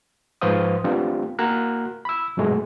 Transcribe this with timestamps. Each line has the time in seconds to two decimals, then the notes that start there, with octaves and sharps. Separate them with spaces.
0.41 G#2 F3 B4 C5 F5 D#6
0.84 A3 B3 C4 D4 F4 G4
1.39 A#3 F#4 A#5 F6 F#6
2.05 B5 E6
2.37 G2 B2 F#3 G#3 A3